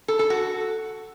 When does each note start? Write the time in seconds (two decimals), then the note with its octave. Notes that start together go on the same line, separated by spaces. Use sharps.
0.08 A4
0.19 A4
0.30 F#4